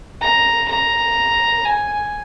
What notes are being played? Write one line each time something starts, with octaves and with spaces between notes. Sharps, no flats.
A#5
A#5
G#5